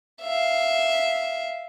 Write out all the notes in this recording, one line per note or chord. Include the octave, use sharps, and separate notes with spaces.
E5 F5